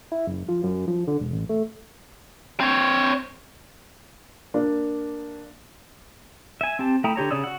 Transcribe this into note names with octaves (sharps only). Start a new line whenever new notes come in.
E4
F#1
F3
F#2
F3
D3
E1
A1
A3
C4 C#5
A#3 D4
E5 G#5
C4 G4 A5
A3 E4 G5 A#5 D#6
D3 G4 C#5 A#5
C#3 C#5 D5 D#6 E6
F#4 F#5